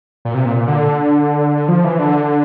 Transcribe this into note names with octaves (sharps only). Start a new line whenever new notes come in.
A#2
C3
A#2
A#2
D3
F3
E3
D3